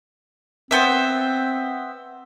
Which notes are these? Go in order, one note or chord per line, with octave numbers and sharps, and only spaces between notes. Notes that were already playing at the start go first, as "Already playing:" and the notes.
B3 C4 C5 E5